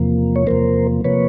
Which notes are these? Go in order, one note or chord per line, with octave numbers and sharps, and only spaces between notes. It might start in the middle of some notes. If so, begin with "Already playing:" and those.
Already playing: E2 C3 F3 A#3
C#5
E2 C3 F3 A#3 A#4 C5
C3 F3 A#3 B4 C#5